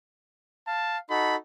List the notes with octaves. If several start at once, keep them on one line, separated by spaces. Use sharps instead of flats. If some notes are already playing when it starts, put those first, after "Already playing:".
F5 A5
D#4 F#4 A4 B5